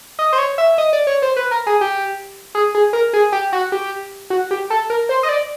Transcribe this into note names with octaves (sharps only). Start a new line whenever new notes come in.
D#5
C5
C#5
E5
D#5
D5
C#5
C5
B4
A#4
G#4
G4
G#4
G#4
A#4
G#4
G4
F#4
G4
F#4
G4
A4
A#4
C5
D#5
D5